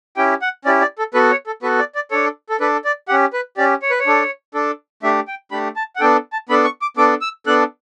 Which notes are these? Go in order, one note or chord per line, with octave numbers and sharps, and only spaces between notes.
C#4 E4 G4 G5
F#5
C#4 E4 G4 D5
D5
A4
B3 F#4 A4 B4
C#5
A4
B3 F#4 A4 B4
D5
D5
D4 A4 C#5
A4
D4 A4 B4
D5
C#4 G4 F#5
B4
C#4 G4 D5
C#5
B4
C#5
D4 A4
D4 A4
A3 D4 G4 E5
G5
A3 D4 G4 B5
A5
F#5
B3 D4 A4 G5
A5
B3 D4 A4 B5
C#6
D6
B3 D4 A4 D6
E6
B3 D4 A4 F#6